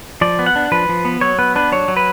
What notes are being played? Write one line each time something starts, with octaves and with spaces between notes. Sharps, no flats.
F3 D5
B3
F#5
D4
F3 B4
F3
B3
F#3 C#5
B3 B4
D4 B4
F#3 C#5
F#3
B4